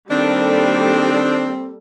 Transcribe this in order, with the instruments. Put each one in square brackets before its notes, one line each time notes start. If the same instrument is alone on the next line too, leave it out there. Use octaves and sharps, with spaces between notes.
[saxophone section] D#3 D4 [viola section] G3 A#3 A4 [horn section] C4